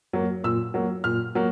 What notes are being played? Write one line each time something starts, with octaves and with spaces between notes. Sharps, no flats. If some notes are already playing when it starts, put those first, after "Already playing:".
F#3 A#3
A#2 E6
F#3 A#3
A#2 F6
F#3 A#3